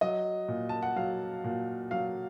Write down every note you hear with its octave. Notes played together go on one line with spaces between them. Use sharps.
F#3 D#5
A#2
A5
F#5
F#3 F5
A#2
F#3 F5